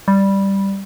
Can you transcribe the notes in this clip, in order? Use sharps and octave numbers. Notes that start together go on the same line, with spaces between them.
G3